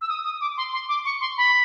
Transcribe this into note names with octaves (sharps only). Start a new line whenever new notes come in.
E6
D#6
D#6
D6
C6
C6
D6
C#6
C6
B5